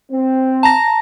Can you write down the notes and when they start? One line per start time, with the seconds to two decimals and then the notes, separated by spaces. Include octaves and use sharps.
0.11 C4
0.63 A5 A#5 A#6